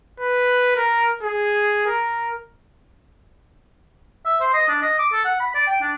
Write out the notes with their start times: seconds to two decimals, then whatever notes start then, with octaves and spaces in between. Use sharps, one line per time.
0.20 B4
0.76 A#4
1.23 G#4
1.86 A#4
4.25 E5
4.40 C5
4.54 D#5
4.69 D4
4.82 D#5
4.99 D6
5.12 A4
5.25 F#5
5.40 B5
5.55 D5
5.67 G5
5.81 D4